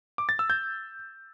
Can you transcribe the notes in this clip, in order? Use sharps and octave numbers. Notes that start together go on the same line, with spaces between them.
D6
A6
E6
G6